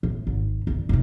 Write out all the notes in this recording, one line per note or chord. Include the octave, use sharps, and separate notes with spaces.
A1
G#1
F#1 D3
F1 A2